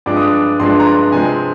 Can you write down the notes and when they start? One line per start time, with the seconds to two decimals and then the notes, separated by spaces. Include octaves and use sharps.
0.06 G2 F3 G#3 D4 D6
0.17 D#6
0.28 D6
0.60 G2 F3 G#3 D4 C6
0.79 A#5
0.86 C6
1.12 C3 F3 G#3 C4 G#5